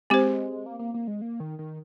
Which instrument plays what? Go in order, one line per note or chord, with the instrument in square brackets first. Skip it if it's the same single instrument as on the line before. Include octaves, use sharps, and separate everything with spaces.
[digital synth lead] G#3 [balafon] C4 G4 C5
[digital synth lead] A#3
A#3
A#3
G#3
A#3
D#3
D#3